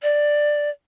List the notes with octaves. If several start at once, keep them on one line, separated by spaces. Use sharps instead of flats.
D5